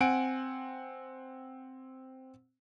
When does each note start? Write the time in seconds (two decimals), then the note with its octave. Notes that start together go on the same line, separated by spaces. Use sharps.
0.01 C4 F#5 G#5 D7